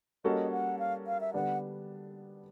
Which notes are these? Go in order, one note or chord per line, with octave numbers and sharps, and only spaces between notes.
G3 A#3 C#4 F#4 A4 D#5
F#5
F5
F5
E5
D3 G3 B3 D4 F#5